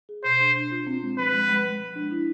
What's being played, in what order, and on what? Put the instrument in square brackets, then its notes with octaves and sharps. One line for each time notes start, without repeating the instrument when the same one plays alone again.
[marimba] G#4
[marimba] B2 [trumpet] C5
[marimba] D4
D4
F4
C4
G#3
[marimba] F3 [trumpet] B4
[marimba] G#3
G#3
F3
F3
D4
E4